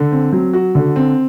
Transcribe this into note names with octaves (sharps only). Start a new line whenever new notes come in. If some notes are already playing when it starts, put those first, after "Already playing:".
Already playing: D3
C4
F#3
F#4
D3
C4